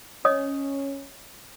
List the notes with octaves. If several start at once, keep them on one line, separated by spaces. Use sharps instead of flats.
C#4 C#5 D#5 D#6